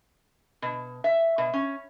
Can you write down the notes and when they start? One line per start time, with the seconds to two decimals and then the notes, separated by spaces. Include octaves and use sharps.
0.62 B2
1.04 E5
1.38 B2
1.53 C#4